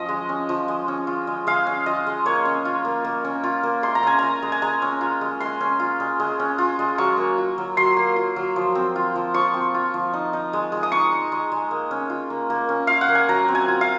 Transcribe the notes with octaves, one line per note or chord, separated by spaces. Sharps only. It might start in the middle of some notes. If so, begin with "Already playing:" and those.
Already playing: F3 C#4 D#5
G#3
C#4
F3
G#3
C#4
F4
G#3
G#3 F5
C#4
F4 D#5
G#3
A#3 C#5
C#4
F4
A#3
A#3
C#4
F4
A#3
G#3 C6
A#5
C#4 G#5
F4 A#5
G#3
G#5
G#3 A#5
C#4
F4
G#3
G#3 C6
C#4
F4
G#3
G#3
C#4
F4
G#3
F#3 C#6
A#3
F4
F#3
F#3 C6
A#3
F4
F#3
F3
C4
F4
F3
F3 C#6
C4
F4
F3
D#4
D#4
G#3
G#3
D#6
D#4 C#6
D#4
G#3
G#3
A#3
C#4
F4
A#3
A#3
C#4
F4 F5
F#5
A#3
G#5
F#3 A#5
C4
G#5
F4
F5